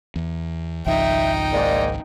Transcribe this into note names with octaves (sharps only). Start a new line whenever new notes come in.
E2
G#1 C#2 F3 D#4 E5 G5
G#2 G#3 A#3 D5